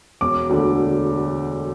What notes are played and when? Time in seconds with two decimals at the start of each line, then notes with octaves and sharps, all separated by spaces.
0.21 E1 D6
0.49 D2 D3 A3